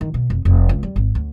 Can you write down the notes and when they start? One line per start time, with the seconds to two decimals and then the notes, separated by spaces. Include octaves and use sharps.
0.01 D#3
0.14 B2
0.30 F1
0.45 F1
0.69 C#2
0.83 G3
0.96 G#1
1.15 D2